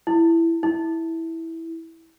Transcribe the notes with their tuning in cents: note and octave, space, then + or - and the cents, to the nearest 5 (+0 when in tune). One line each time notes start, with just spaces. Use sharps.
E4 +10
E4 -10